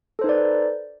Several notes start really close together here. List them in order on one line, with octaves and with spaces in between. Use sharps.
A4 C5 D#4 B4 D5